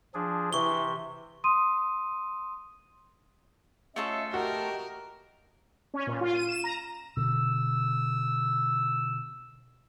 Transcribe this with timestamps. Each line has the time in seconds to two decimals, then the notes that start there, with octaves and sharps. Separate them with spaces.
0.14 F3 D4 G#4
0.53 C3 E3 C#6 G7
1.44 C6 D#6 D#7
3.96 A3 C#4 F4 A4 D#5 E5
4.34 F#4 G4 A#4 D#5 G5
5.94 C#4
6.07 A#2
6.21 F4
6.35 D#7
6.48 E7
6.64 A#5
7.17 B2 D3 E6